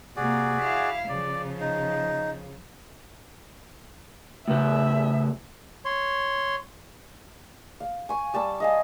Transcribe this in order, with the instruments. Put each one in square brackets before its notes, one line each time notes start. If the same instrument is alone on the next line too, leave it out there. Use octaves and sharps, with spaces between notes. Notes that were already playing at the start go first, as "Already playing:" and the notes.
[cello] C3 A#3 [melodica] F#4 G#4 D5
[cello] E4 F5
[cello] C#3 F3 [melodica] D5
[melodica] D#4
[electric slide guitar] A2 C#3 B4 [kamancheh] E5
[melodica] C#5 C6
[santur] F5
G#5 C#6
G3 A5 C#6 E6
D#5 F5 G#5